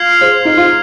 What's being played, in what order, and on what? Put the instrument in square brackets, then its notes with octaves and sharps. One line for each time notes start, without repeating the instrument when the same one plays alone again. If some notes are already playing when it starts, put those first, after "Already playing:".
Already playing: [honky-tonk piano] F4 [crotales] F6 G#6 C7 F7
[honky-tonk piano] G#4 C5
D#4
F4